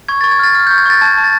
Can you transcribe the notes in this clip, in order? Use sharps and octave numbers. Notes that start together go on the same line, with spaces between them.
C#6 G#6
A6
C#6
G#6
F6 A6
F6
G6
C#6
G#6
C#6 A6
A5 G#6
A5
A6